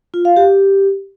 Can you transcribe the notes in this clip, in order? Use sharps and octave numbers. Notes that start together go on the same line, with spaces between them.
F4
F5
G4